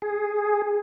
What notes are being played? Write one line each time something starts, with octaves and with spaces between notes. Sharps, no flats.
G#4